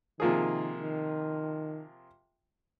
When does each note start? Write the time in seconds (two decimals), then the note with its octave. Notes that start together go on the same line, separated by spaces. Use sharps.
0.20 C3 D#3 F3 A#3 F4 G#4
0.79 D#3